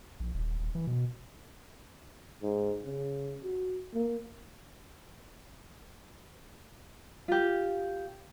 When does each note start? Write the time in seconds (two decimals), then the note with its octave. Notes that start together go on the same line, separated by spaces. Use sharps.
0.20 A#1
0.34 D#1
0.60 D#1
0.75 E3
0.87 B2
2.42 G#2
2.84 C#3
3.43 F#4
3.94 A#3
7.28 F4 G4